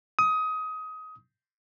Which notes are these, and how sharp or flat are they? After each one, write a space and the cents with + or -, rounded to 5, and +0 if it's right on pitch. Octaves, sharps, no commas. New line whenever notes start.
D#6 +20